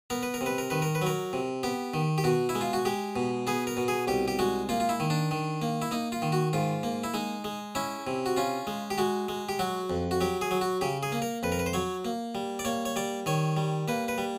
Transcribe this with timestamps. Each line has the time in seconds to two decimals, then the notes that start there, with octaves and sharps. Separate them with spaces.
0.10 B3 A#4
0.23 B4
0.34 A#4
0.41 C3
0.46 B4
0.58 A#4
0.70 D#3 B4
0.82 A#4
0.95 B4
1.02 F#3 A#4
1.33 C3
1.63 B3 G4
1.94 D#3
2.18 G4
2.24 B2 F#4
2.49 E4
2.55 G#3
2.61 F4
2.73 F#4
2.85 G#3 G4
3.16 B2
3.47 B3 G#4
3.67 A#4
3.77 B2
3.88 G#4
4.08 C2 G4
4.28 G4
4.39 G#3 F#4
4.69 A#3 F4
4.80 F4
4.89 E4
5.00 D#3
5.10 D4
5.31 D#3
5.62 A#3
5.82 E4
5.91 A#3 D#4
6.12 F4
6.22 D#3
6.32 F#4
6.53 G#2 F4
6.83 A#3
7.04 E4
7.14 G#3 D#4
7.44 G#3
7.75 C#4 E4
8.07 C3
8.26 F#4
8.37 C#4 F4
8.67 G#3
8.91 G4
8.98 G#3 F#4
9.29 G#3
9.49 G4
9.59 F#3 F#4
9.90 F2
10.11 F#4
10.21 F#3 G4
10.41 G#4
10.51 F#3
10.61 F#4
10.81 C#3 G4
11.03 G#4
11.12 A#3
11.22 A#4
11.43 F2 B4
11.52 A#4
11.59 B4
11.66 C5
11.73 F#3 C#5
12.05 A#3
12.35 G3
12.59 D5
12.65 A#3 C#5
12.85 C#5
12.96 G3 D5
13.26 D#3 C#5
13.57 G3
13.88 A#3 B4
14.08 B4
14.18 G3